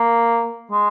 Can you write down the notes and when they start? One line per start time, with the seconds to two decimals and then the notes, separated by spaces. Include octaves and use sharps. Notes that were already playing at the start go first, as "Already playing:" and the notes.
Already playing: A#3
0.71 G#3